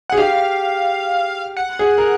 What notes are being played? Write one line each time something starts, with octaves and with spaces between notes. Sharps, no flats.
F#5
G#4
G4 F5
F#5
G#4
A#4